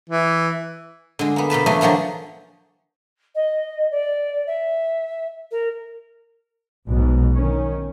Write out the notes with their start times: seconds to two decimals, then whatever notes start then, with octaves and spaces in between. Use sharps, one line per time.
0.10 E3
1.19 D3 G#3
1.36 A#3 B3
1.50 B2 A#3 B4 A5
1.66 E3 F#3 A3 D4 D#5
1.81 D3 F3 F#3 A#3 G#4
3.34 D#5
3.90 D5
4.46 E5
5.51 A#4
6.90 B1 G#2 B2
7.35 D#3 C#4